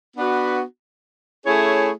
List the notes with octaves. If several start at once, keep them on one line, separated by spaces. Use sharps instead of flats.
B3 D4 F#4 B4
A3 C#4 E4 G#4 C#5